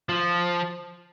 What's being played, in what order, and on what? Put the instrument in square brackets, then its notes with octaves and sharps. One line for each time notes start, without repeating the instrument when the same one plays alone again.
[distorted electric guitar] F3